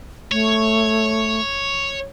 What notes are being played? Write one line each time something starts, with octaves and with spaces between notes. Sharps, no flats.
A3 C#5